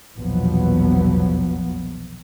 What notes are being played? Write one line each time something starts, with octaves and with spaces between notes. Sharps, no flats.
A#1 E2 B2 F3 F#3 B3